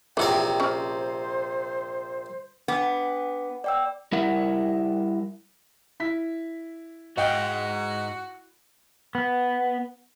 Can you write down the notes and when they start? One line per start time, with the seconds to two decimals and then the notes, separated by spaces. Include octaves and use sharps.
0.17 A#1 C3 E3 C#5 F#5 G5
0.60 C#4 C5
2.68 B3 D4 F#5 D6
3.64 D5 G5 E6
4.12 G3 E4 A#4 E5 F#5
6.00 E4 B6
7.17 G#2 G#3 F#4 D#5 F5 G5
9.15 B3